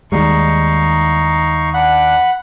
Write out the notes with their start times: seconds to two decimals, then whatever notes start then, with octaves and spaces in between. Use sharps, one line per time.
0.12 D#2 G3 G#3 D#4 F5 C#6
1.74 D4 F#5 B5